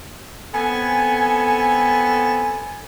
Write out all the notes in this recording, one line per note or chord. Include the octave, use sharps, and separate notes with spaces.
B3 C4 A4 G#5